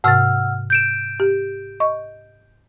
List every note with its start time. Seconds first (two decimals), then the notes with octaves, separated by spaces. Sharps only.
0.04 G#2 C3 F#5 E6 F6 A6
0.70 G6 D7 E7
1.20 G4
1.80 D#5 C#6